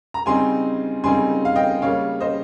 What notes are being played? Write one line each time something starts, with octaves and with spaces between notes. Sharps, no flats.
A#5
C#3 G3 C4 D#4 G#5 C6
C#3 G3 C4 D#4 G#5 C6
F5
D#5 G5
C#3 G3 A#3 C#5 F5
C5 D#5